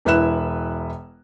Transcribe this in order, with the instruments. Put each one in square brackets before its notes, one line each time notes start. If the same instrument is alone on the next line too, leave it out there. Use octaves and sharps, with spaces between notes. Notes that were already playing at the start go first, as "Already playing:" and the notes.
[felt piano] E1 E4 B4 E5 F#6 E7